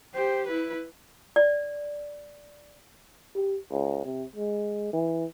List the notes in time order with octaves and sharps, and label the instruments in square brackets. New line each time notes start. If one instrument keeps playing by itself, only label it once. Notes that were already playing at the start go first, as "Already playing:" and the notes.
[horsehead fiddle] G4 C5
E4 B4
[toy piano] D5
[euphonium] G4
C#2
C3
G#3
E3